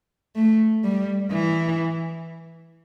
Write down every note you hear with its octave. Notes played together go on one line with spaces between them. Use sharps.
A3
G3
E3